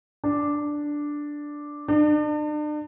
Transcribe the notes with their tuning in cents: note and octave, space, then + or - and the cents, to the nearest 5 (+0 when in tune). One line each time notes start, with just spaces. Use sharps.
D4 +0
D4 +40